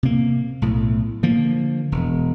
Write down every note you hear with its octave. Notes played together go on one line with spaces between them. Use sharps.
C3 A#3
B1 A2
D3 F3 A#3
E1